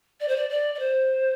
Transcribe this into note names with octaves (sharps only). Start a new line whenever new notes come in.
D5
C5
D5
D5
D5
C5